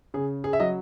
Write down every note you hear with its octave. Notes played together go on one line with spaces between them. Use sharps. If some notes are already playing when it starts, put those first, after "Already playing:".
C#3 G#4
G#4
E5
F#3 D#5